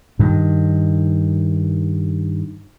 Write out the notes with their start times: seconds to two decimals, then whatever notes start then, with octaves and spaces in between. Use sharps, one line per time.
0.19 G2 D#3